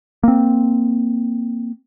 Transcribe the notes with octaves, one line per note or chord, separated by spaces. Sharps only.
A#3 C4